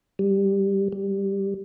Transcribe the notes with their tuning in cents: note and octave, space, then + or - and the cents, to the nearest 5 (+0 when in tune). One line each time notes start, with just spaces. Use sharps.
G3 +5
G3 +5